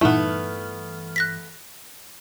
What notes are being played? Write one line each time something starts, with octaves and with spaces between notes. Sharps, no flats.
G2 A#2 E3 A3 B3 D#4 E4 F6
F#6 A#6 B6